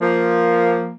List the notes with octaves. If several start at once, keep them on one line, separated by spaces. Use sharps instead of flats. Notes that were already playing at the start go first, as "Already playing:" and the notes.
F3 A#3